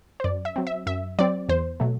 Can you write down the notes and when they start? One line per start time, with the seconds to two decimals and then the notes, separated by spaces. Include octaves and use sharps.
0.20 C5
0.24 F#2 D5
0.45 E5
0.56 F#3 C4
0.67 E5
0.86 F#2 E5
1.19 F#3 C4 D5
1.49 E2 C5
1.80 B2 F#3 A3